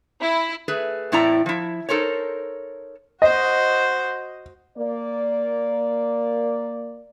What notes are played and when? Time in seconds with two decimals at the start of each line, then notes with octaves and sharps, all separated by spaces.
0.21 E4
0.68 A3 G#4 B4
1.12 E2 A2 C4 E4 D5 A#5
1.46 F3 E4
1.89 D#4 A4 A#4 C5 C#5
3.22 F#4 C5 D#5
4.77 A#3 D5